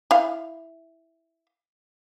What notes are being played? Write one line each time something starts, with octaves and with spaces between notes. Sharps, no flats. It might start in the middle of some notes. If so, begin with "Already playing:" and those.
E4 F5